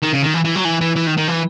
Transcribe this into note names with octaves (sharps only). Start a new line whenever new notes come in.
D#3
C#3
D#3
E3
E3
F#3
E3
E3
E3
D#3
D#3
E3